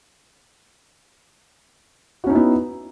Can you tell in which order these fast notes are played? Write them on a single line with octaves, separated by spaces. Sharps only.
F#4 C#4 D#4 E4 B3